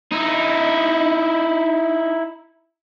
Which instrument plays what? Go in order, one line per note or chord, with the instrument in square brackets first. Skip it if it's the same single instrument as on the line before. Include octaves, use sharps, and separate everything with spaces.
[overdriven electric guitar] D#4 E4